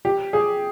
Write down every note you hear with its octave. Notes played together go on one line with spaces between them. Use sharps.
G4
G#4